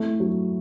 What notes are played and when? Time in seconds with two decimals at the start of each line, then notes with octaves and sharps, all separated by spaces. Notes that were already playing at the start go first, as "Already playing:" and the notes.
Already playing: A3 E4
0.20 F#3